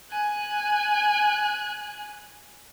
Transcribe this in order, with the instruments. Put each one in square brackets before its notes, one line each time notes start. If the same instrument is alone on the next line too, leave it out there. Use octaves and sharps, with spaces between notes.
[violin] G#5 F#6